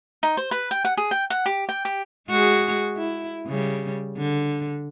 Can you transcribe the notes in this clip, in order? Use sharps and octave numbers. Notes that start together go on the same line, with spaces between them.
D#4
C5
B4
G5
F#5
G#4
G5
F#5
G4
G5
G4
G#3 F#4 G#4
E4
C#3 G3
D3